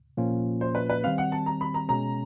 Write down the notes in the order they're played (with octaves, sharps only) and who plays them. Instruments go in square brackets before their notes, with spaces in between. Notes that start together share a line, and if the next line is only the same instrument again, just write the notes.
[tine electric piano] A#2 F3 A#3 C#4 F4
[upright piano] C5
B4
B4
[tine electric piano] D#3 G3 C4 [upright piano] F5
[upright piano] F#5
A5
A#5
B5
A#5
[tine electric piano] B2 G#3 C#4 [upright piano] A#5